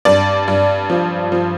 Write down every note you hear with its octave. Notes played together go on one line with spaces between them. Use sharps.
G2 D5
G2
F3
F3